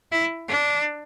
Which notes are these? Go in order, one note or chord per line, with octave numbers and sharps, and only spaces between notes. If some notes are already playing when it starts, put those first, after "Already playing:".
E4
D4